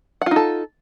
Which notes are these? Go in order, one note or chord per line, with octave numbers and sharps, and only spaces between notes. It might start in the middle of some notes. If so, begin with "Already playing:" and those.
D#4 F4 A4 F#5